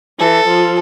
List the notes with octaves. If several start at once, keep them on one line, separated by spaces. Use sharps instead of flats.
E3 A4
F3